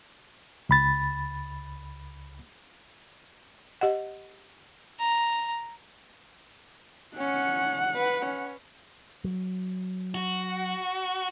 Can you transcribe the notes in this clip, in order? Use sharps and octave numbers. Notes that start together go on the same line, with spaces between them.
C#2 B5 A6
G4 D#5 F#5
A#5
C#4 F#5
B4
C#4
F#3
F#4